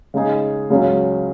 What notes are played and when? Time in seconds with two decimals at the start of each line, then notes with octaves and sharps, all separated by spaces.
0.14 C#3 G#3 D#4 G#4
0.70 C#2 C#3 F#3 C#4